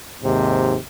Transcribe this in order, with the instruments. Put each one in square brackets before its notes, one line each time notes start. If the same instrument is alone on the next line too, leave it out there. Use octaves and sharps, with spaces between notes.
[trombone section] D#2 G#2 C3